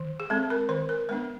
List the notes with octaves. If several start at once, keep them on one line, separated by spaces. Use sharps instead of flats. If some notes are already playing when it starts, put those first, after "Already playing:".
Already playing: D#3
G#4
G#3 C4 A4
A#4
D#3 B4
A#4
G#3 B3 D4 B4